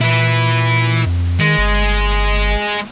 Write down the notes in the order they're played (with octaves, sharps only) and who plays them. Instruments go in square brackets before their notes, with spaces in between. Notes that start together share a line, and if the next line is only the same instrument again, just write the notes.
[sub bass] A#2 [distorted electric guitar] E4 B4
[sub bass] F2
[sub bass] D#3 [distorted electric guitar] G#3
[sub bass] G1